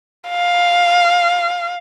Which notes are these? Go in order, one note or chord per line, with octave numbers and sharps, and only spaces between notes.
F5